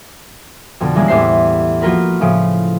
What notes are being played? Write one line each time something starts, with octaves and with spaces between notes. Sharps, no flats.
F2 B2 D3
E3 G3 G#3 A#3 C#4 E4
E2 A2 G4 C5 E5 C7
F3 A#3 F4 F#4 A#4 B4
A2 C#3 F3 C#7 D7